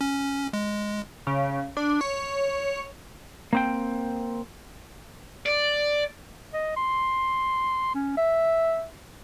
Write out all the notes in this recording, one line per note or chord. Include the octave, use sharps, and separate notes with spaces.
C#4
G#3
C#3
D4
C#5
A#3 C4 G5
D5
D#5
C6
C#4
E5